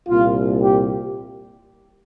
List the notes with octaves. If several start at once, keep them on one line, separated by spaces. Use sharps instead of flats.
C2 A#2 F4
G4